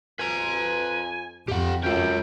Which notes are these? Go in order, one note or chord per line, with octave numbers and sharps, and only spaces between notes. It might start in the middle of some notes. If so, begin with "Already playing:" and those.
F2 B4 G#5 A#5
F2 G4 F#5
F#2 C#4 F4 G5